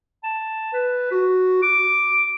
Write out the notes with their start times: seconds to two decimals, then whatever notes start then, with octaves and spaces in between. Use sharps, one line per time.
0.24 A5
0.73 B4
1.11 F#4
1.62 D6